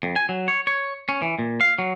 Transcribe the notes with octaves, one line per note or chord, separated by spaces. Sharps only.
F2
G#5
F#3
C#5
C#5
C#4
E3
A#2
F5
F#3